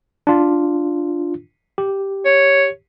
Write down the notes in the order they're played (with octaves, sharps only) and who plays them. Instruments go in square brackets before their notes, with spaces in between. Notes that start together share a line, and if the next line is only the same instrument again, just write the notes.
[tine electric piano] D4 F4
G4
[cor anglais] C#5